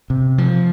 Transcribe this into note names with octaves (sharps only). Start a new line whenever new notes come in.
C3
F3